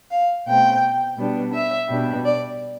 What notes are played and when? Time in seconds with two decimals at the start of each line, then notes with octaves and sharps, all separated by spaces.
0.11 F5
0.46 B2 A3 C4 G5
1.18 B2 G3 B3 D4
1.53 E5
1.89 B2 G3 D4
2.25 D5